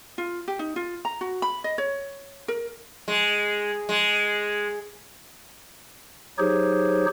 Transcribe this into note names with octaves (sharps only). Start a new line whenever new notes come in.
F4
G4
D#4
F4
A#5
F#4
B5
D#5
C#5
A#4
G#3
G#3
F#3 D#4 G4 G#4 C5 C#5